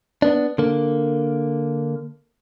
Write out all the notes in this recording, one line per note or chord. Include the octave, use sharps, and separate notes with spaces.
B3 D4
D3 A#3